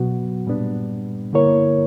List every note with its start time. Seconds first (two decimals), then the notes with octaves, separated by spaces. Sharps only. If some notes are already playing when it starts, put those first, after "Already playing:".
Already playing: B2 F#3 B3 F#4
0.47 A#2 G3 B3 D4
1.33 D3 A#3 E4 A#4 C#5